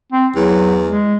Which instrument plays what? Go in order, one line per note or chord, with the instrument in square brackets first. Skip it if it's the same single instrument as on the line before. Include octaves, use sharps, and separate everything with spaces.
[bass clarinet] C4
[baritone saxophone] E2 [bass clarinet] F#3
[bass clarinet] G#3